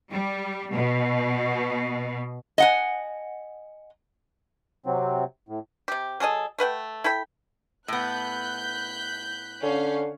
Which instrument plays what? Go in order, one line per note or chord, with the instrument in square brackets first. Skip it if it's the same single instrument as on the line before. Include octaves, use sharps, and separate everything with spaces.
[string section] G3
B2
[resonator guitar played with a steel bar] D#5 F#5 G#5
[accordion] C3 F#3 C4
A2
[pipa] C3 G4
F#3 G#4 A4 D#5
A3 B4 F#5 G5
E4 A4 G5 B5
[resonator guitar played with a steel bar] A2 B3 [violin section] F#6 G6 B6
[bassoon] D3 [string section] C#4 F5